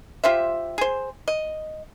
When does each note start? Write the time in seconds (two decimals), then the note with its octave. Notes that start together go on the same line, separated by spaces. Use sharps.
0.24 F4 G4 C5 E5
0.78 G#4 C5
1.28 D#5